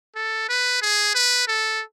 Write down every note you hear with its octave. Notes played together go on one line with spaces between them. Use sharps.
A4
B4
G#4
B4
A4